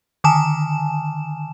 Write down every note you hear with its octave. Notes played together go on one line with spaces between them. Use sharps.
D3 D#3 G#5 A5 E7